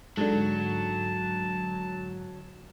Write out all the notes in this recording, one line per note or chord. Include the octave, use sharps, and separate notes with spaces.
G#2 D3 F#3 A5